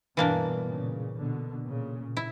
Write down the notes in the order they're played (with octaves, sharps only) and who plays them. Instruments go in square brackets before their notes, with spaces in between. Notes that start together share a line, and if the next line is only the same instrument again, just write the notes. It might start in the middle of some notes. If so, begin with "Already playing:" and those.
[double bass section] G2 B2 [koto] E3 A#3 D4
[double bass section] A#2 C#3
B2 D3
A#2 C#3
[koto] E4